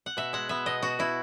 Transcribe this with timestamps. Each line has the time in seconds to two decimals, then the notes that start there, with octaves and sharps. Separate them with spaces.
0.06 F#5
0.17 B2 E5
0.33 G#3 F#5
0.49 B3 E5
0.66 B2 D#5
0.82 B2 F#4
0.99 B2 E4